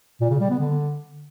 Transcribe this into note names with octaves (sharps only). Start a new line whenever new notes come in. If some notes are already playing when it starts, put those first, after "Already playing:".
A#2
C#3
G3
B3
D3